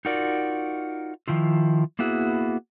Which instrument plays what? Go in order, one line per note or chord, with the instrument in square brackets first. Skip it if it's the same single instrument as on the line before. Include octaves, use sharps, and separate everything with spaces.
[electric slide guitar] D#4 F4 F#4 A#4 D5
D#3 F3 E4 F4
A#3 B3 E4 F#4 G#4